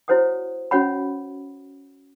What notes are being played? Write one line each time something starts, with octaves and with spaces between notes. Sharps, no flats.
E4 F#4 C5 C#5 F#5 D#6
C#4 F#4 C#5 F#5 B5